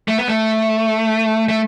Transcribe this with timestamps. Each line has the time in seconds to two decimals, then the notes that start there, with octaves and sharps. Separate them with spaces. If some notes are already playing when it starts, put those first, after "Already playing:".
0.08 A3
0.18 B3
0.28 A3
1.49 A3